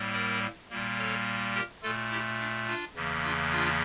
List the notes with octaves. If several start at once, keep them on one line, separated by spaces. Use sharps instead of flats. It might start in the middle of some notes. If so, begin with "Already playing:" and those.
Already playing: A2 G3 A#3
A#4 D5
A#2 G3 A#3
A4 C#5
G4 A#4
A#2 A3 F4 A4
E4 G4
D4
D4 F4
E2 C#3 E3 A#3
D4 F4
D4 F4